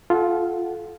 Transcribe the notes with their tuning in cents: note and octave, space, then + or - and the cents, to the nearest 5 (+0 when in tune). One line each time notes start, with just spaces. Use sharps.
F4 +0 A4 -30 F#5 +0